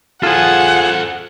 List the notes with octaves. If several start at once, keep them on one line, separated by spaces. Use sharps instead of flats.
F4 G#4 A4 C5 F#5